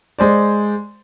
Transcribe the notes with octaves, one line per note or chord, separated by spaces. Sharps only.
G#3 C5 D5